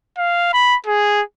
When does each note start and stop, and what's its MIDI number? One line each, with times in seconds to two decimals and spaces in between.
0.17 0.51 77
0.53 0.76 83
0.86 1.22 68